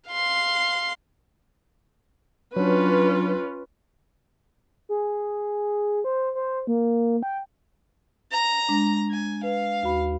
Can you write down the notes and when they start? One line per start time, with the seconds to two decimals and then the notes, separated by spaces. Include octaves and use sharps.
0.11 F5 C6
2.56 F#3 C#4 D4 F4 B4
4.89 G#4
6.04 C5
6.35 C5
6.67 A#3
7.23 G5
8.32 A#5
8.69 G#3 D4
9.11 G#5
9.43 B4 F5
9.83 D#2 F#4 B5